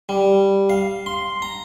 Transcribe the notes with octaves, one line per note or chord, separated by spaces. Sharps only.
G3
F5
C6
A#5